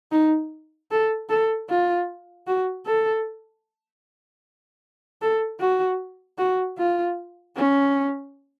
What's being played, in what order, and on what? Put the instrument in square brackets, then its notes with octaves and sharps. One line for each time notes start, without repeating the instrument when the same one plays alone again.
[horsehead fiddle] D#4
A4
A4
F4
F#4
A4
A4
F#4
F#4
F4
C#4